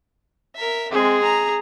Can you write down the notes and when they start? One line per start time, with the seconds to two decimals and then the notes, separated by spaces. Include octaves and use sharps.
0.56 A#4 E5
0.92 G#3 C4 G#4
1.23 A#5